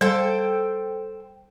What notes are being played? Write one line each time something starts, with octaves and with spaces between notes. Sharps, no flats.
G3 A4 C5 G5